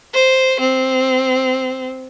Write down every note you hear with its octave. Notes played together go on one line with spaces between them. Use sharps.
C5
C4